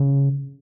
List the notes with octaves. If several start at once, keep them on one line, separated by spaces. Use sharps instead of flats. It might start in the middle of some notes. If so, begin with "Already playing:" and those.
Already playing: C#3